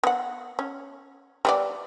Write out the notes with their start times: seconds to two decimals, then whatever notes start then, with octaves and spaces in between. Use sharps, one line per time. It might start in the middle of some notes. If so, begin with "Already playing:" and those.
0.04 B3 F#5
0.59 C#4
1.45 G3 B3 D5